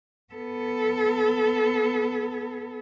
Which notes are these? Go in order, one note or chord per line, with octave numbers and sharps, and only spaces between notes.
B3 A4